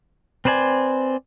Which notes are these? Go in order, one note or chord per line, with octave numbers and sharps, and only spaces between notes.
C4 B4 C5 D5 G#5